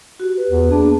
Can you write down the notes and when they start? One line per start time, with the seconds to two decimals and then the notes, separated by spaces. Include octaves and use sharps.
0.20 F#4 G4
0.37 B4
0.50 E2
0.71 A#3 B3 D4 G#4